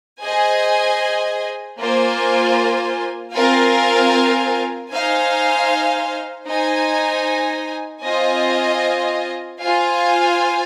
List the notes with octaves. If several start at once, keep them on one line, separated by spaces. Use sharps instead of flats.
G#4 C5 D#5 G#5
A#3 F4 C5 G#5
C4 F4 A#4 F5 G#5
D#4 C5 F5 G#5
D#4 C5 G#5
C4 F4 C5 D#5 G#5
F4 C5 F5 G#5